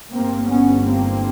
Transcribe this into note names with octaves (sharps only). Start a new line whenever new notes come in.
G1 G2 A#3 C4
B3 C#4
A#3 C4